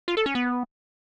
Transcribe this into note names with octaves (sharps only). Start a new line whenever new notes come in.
F4
A4
C#4
B3